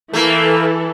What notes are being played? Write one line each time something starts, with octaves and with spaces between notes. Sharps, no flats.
E3 A3 A#3 A4